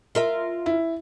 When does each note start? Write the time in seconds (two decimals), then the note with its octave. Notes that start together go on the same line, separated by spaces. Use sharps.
0.15 F4 A#4 E5
0.66 E4